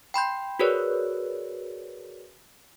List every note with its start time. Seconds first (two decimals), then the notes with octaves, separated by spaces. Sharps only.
0.14 G5 B5 C6 G6
0.59 F#4 G#4 A#4 B4 C#5 D5